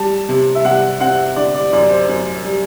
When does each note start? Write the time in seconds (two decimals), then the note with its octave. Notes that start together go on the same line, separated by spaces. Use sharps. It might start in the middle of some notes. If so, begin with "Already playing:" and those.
Already playing: G3 A5
0.29 C3
0.55 E5
0.65 C3 F#5
1.01 C4 F#5
1.36 D3 D5
1.55 D5
1.73 F#2 D5
1.91 C5
2.09 F#2
2.44 G3